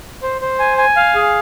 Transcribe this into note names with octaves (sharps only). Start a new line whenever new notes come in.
C5
C5
G#5
G#5
F5
G#4